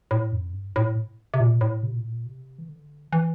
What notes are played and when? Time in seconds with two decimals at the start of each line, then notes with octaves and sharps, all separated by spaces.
0.11 A2
0.32 F2
0.53 G2
0.76 A2
1.34 C3
1.40 A#2
1.61 A2
1.83 C3
1.91 A#2
1.99 A2
2.07 A#2
2.26 C3
2.58 E3
2.69 D3
3.13 E3